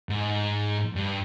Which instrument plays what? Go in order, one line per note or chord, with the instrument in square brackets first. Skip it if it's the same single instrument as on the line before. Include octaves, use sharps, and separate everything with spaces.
[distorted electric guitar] G#2
G2